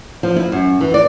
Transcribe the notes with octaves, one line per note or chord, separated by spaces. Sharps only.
F3
E4
F#2
E3
D5